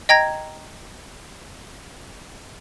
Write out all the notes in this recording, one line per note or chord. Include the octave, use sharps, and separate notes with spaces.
D#5 G5 A#5 G#6 A#6